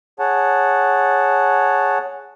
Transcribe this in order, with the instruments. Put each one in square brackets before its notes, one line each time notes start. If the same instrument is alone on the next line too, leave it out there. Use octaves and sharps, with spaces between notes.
[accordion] G#4 C#5 F#5 A5